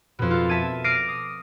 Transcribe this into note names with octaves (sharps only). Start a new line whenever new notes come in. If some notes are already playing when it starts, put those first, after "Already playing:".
F2 B2
F4 A4
E5 A5 G#6 D#7
D6 F6 A#6 C7 D7 D#7
D#6